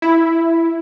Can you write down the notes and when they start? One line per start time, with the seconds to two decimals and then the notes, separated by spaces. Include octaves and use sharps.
0.02 E4